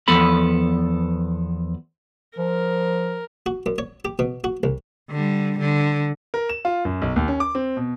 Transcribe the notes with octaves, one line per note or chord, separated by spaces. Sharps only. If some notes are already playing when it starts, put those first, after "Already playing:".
E2 F3 B3 A4 B5
F3 A#4
F#4
F#2
C#5
G4
B2
F#4
C2
D3 G3
D3
A#4
E7
F4
F#2
B1
D#2
C#4
D6
C4
B2